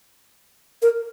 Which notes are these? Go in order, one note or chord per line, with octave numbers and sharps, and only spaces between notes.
A#4